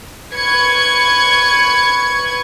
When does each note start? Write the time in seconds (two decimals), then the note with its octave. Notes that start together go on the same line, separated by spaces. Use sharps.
0.35 B4 C#6 G#6 C#7